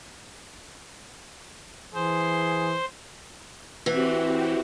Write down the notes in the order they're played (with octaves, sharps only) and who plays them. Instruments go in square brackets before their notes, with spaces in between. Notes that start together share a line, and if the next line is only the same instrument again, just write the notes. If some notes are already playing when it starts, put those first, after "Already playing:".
[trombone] E3 [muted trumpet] G#4 [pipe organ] C5
[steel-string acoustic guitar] E3 [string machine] C4 F#4 G4